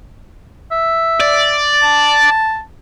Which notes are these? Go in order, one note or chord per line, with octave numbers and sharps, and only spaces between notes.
E5
D5
A5